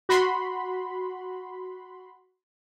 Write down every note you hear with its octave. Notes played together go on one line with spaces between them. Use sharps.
F#4 B5 C6